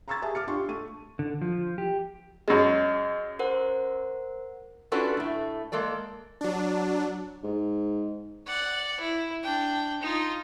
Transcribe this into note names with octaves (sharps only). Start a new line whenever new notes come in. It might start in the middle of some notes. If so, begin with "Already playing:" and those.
A#5 C6 C#6 E6 G#6 A6
G4 G#4 E5 G#5 A5
D6 F6 C#7
D4 F4 G4 C6 C#6
A3 C#6 D#7
D3
F3
G4
F#2 G#3 D#5
A#4 C5 F#5
C#4 D4 F4 F#4 A4 B4
A2 A3
G#3 A#3 A4 D5
F#3 D4
G#2
D5 F#5
E4
D4 G5
D#4 F4